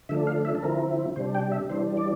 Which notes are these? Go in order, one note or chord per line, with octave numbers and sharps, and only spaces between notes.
D3 F3 A3 D4 E5
F5
E5
A4
D3 F3 C4 E4 A#4
C3 G3 D4 C5
G5
E5
E3 G3 D4 C5
D5